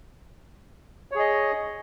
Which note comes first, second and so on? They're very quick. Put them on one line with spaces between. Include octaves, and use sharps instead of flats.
C#5 G#4 D#5